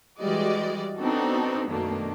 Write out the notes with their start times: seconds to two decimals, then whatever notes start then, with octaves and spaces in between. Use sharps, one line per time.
0.20 E3 G3 G#3 F#4 D5 D#5
0.97 B3 C4 D4 D#4 F#4 A4
1.67 F#2 B2 D#3 A3 A#3 D4